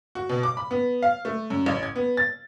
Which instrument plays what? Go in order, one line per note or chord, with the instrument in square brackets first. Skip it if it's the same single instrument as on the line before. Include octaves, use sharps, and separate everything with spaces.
[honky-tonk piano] F#4
B2
D6
B5
B3
F5
A3
F#2
A1
G#6
B3
A6